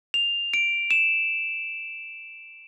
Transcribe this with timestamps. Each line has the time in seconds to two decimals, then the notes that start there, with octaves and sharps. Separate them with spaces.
0.14 F7
0.54 D7
0.91 E7